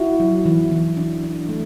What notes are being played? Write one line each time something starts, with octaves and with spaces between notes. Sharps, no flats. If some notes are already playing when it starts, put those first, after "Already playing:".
Already playing: E4 F#4
F#3
E3
E3
D4
D4
A3